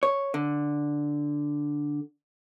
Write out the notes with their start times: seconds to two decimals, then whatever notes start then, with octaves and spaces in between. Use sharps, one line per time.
0.03 C#5
0.34 D3